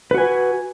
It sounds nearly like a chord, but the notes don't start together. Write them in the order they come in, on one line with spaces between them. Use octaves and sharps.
B4 F#4 G#5